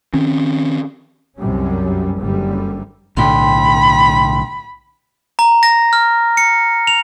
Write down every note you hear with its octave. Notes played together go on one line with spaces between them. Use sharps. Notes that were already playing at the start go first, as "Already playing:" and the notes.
D#3 C4 C#4
C2 F#2 C3 G3 C#4
F#1 F#2 D3 G3
B1 A2 D3 G5 B5 C6
A#5
A#6
F6
C#7
F7